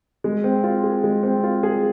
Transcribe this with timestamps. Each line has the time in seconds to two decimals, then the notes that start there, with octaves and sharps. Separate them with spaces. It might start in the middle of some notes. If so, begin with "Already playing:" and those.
0.24 G#3
0.44 C4
0.64 F4
0.84 G#4
1.04 G#3
1.23 C4
1.44 F4
1.63 G#4